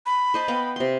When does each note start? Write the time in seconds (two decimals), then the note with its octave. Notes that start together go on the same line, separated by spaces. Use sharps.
0.06 B5
0.34 C5 D#5 A5
0.48 B3 F5 G5
0.76 C3 C6